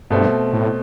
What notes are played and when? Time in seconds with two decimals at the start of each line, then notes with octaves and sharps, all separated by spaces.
0.10 G2 B2 A3 C4
0.53 A2